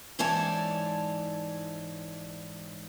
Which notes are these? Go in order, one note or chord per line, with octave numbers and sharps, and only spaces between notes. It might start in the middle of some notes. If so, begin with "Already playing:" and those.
G#2 E3 C#5 D5 A5